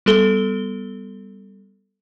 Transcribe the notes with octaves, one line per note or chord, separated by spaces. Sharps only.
G3 B3 A4 G7